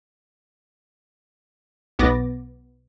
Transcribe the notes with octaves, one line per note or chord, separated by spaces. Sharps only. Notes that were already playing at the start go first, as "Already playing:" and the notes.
B1 B3 D6 A6 A#6